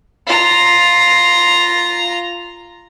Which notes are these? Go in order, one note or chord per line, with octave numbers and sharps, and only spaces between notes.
F4 A#5